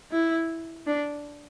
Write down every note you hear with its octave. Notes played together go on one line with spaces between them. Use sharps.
E4
D4